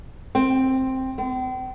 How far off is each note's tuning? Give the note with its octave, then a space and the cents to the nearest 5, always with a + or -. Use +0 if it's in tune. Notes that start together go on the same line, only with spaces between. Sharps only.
C4 +5
C4 -40